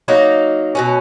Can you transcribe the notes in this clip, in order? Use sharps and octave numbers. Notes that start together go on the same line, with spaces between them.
F#3 A#3 D#4
B2 F#3 C#4